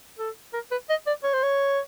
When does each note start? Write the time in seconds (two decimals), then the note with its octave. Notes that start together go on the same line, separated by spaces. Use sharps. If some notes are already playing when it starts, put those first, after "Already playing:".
0.19 A4
0.53 A#4
0.71 B4
0.89 D#5
1.07 D5
1.23 C#5
1.34 C5
1.43 C#5